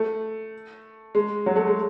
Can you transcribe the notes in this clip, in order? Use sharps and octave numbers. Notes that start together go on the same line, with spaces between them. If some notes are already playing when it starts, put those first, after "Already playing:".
Already playing: A3
G#3
F#3
A3
G#3